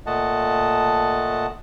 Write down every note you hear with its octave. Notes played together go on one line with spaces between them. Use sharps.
A#2 A3 D#5 F#5 A5